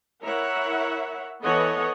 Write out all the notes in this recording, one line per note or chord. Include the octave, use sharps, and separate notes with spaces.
E4 A#4 C#5 E5 F#5
E3 B3 A4 C#5 D#5 F#5